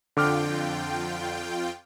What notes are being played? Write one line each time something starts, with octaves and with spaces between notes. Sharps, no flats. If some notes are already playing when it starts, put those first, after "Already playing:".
F2 D3 F4 G5 D6 F6